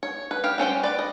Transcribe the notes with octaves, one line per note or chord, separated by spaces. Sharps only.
C#5
B4
G4 F5
G3 C#4 C5 G5
B4 D5
D#5